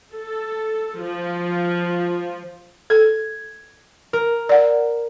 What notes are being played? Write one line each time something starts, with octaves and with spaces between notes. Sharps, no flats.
A4
F3
A4 G#6
A#4
D5 F#5